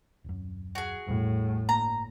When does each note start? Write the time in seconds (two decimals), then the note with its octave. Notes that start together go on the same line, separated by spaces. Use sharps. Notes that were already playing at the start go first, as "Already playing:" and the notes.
0.24 D#1 F#2
0.75 F#4 G#4
1.07 A1 E2 A2 G3
1.69 G1 A#3 A#5